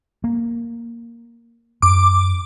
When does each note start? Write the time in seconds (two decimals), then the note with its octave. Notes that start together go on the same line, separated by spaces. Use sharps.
0.24 A#3
1.82 F#2 D6